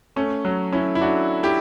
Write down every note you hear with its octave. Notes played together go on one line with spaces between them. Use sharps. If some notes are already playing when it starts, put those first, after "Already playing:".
A3 C#4
F#3
C#4 E4
E4
D4 F#4
E4 G4